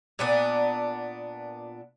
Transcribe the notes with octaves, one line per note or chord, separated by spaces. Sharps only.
A#2 B3 D4